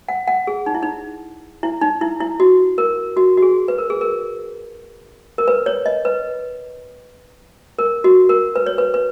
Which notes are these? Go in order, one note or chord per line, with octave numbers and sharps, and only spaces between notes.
F#5
F#5
G#4
D#4
E4
D#4
E4
D#4
E4
E4
F#4
A#4
F#4
F#4
G#4
B4
A#4
G#4
A#4
A#4
B4
C#5
D#5
B4
A#4
F#4
A#4
B4
C#5
B4
B4